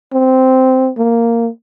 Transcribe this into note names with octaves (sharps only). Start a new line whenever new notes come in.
C4
A#3